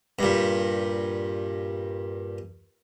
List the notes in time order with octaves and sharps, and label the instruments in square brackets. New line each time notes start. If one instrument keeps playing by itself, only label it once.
[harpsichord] G2 A#2